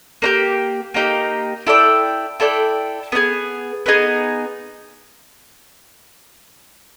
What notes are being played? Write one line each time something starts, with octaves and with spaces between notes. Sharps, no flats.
A#3 D#4 G4
A#3 D#4 G4
E4 A4 D5 G5
E4 A4 D5 G5
B3 D#4 G#4
B3 D#4 G#4